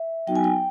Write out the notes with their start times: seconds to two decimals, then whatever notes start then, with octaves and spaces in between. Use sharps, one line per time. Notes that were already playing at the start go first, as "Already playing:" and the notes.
Already playing: E5
0.27 F#3 B3 D#4 F#4 G5
0.36 G#5
0.44 G5